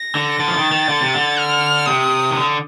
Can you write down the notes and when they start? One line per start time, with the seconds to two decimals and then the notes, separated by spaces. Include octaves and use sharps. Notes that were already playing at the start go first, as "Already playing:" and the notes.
Already playing: A#6
0.15 D3
0.39 D3 A6
0.48 F3
0.57 D#3
0.72 D#3
0.89 D3
1.01 C3
1.13 D3
1.38 F6
1.86 C3 D#6
2.30 D#3
2.35 D3